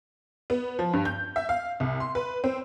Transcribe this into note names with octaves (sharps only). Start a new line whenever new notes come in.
B3
F3
G2
G6
E5
F5
C2
C6
B4
C4